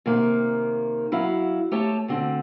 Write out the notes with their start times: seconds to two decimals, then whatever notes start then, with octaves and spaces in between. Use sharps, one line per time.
0.06 C3 D#3 A#3
1.12 F#3 E4 F5
1.72 A3 G4 C#5 A5
2.08 D2 D3 C4